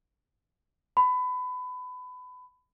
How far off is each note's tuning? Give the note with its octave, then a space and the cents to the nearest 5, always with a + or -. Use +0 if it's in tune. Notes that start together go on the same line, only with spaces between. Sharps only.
B5 +25